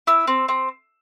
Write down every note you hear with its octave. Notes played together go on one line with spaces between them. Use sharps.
E4 E6
C4
C4